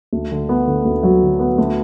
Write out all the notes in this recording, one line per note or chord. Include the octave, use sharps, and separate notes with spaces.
D2
D3
B3
D3
D2
F#3
D3
B3
D2